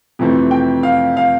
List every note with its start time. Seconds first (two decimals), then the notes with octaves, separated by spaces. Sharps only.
0.19 F2 C3 E3 A3 C4
0.51 G5
0.83 F5
1.17 F5